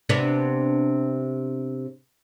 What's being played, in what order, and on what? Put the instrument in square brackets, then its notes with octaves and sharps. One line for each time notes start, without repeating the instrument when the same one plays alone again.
[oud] C3 B3 D4